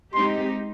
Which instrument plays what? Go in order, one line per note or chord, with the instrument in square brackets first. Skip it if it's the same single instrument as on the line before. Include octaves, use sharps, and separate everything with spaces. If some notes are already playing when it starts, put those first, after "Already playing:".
[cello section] G#3 C4 D#4 G4 [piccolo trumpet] C6